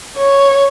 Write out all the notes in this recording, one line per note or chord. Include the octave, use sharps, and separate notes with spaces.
C#5